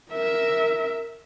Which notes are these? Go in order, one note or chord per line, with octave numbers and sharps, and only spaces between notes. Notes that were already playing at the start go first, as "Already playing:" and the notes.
A#4 E5